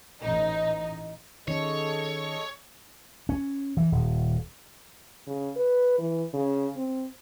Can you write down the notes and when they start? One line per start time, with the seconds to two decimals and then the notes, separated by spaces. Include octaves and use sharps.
0.20 A1 D#4
1.48 D#3 C#4 G#4 A4 C#5 D#5
3.29 C#4
3.77 E3
3.92 D#1
5.27 C#3
5.56 B4
5.98 E3
6.33 C#3
6.76 C4